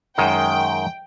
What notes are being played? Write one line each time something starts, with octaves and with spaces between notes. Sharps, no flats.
F#2 D#3 G#3 G5